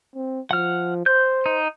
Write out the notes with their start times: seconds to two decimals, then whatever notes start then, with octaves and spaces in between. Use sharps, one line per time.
0.15 C4
0.51 F3 F#5 F6
1.06 C5 G6
1.46 D#4